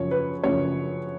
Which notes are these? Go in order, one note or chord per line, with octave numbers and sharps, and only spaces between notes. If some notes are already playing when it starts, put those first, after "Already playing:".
Already playing: F#2 C#3 F3 C#5
B4
F#2 C#3 F3 C#5